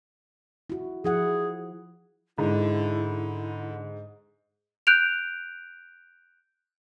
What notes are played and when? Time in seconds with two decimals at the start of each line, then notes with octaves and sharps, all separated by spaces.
0.70 E4 F#4
1.04 F3 E4 G#4 F#5
2.38 G#2 D3 E4
4.87 F#6 G6 D7 F7